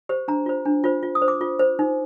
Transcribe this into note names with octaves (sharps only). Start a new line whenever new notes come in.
G4 C5
D4 A#5
F4 C5
D4
F4 C5
F4
D#6
C5
D6
F4
C5
D#4